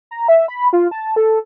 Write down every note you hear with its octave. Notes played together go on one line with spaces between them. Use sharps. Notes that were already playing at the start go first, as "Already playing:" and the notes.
A#5
E5
B5
F4
A5
A4